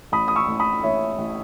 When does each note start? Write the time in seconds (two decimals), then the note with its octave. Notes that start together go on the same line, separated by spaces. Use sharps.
0.12 A1 B5 D#6
0.28 D#6
0.36 C#6 E6
0.48 A1
0.60 B5 D#6
0.83 A1 C#5 E5
1.18 A1